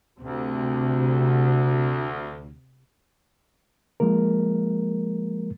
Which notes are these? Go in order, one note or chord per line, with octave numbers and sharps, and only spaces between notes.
D2 C3
F3 G#3 A#3 A#4